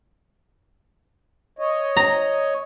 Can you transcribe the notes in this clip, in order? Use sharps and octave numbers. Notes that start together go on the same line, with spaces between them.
C#5 D#5
A#5